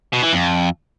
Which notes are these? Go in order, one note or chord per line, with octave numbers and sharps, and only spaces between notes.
B2
E3
F2